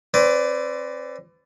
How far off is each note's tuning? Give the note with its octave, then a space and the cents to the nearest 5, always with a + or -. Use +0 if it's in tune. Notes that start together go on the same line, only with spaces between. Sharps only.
C4 +40 B4 +30 D5 -5